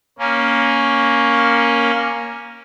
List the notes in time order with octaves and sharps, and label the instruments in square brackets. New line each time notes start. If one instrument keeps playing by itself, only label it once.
[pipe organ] A#3 C#4